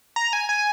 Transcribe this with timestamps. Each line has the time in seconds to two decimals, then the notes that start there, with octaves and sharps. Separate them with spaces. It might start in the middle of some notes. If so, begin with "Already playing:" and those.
0.16 A#5
0.33 G#5
0.49 G#5